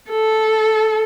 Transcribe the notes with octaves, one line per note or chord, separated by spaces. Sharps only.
A4